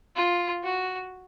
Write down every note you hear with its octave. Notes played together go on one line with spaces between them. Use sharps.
F4
F#4